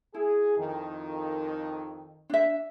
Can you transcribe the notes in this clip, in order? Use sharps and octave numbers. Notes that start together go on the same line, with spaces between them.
E4 G#4
F2 D#3
D4 E5